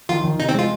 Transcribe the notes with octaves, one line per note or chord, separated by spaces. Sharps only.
D#3 F4
D#3
C3 D#4
C4
G#3 F4